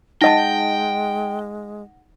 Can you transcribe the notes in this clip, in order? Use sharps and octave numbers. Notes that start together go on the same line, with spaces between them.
G#3 D#4 D#5 F#5 G5 A5 A#6